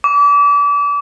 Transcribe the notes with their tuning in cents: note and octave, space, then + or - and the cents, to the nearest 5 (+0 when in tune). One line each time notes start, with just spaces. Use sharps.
D6 -35